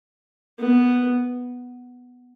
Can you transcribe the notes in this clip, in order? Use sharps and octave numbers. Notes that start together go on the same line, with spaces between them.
B3